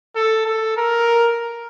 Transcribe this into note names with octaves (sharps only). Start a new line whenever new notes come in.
A4
A4
A#4